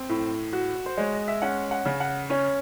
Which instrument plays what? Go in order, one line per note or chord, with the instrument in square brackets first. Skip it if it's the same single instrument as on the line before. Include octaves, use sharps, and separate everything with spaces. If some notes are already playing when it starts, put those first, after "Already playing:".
Already playing: [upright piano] C4 [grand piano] C5
[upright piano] A2
F#4
[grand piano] C5
[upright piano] G#3 [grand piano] C#5
[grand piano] D#5
E5
[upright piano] C#4 [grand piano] F#5
[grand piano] F#5
[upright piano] C#3
[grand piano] F#5
[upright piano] C#4 [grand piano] C#5